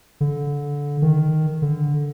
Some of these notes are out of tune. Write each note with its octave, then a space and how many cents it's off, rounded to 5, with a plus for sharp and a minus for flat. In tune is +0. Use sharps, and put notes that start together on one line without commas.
D3 -20
D#3 +0
D3 -10